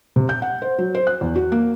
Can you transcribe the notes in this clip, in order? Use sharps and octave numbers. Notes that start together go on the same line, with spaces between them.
C3
G6
F#5
C5
F#3
C5
F#6
E2
F#4
A#3